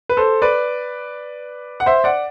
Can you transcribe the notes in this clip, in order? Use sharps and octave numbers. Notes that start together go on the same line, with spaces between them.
B4
A4 C5
B4 D5
F#5
C5 E5
D5 F#5